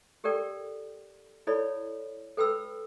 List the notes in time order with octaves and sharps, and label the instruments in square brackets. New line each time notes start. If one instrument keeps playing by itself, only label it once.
[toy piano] G4 A4 A#4 D5 G5
E4 A4 C#5 D5 B5
A4 B4 G5 B5 E6